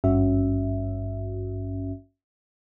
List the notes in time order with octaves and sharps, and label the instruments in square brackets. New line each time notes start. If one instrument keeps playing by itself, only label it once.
[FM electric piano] G#1 G2 C#4 F#4 E5